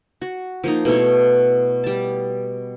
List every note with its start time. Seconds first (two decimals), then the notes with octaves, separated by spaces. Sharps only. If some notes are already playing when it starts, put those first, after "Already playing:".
0.22 F#4
0.64 F3 A#3 D#4
0.85 B2 A3 E4 C#5
1.84 G3 A5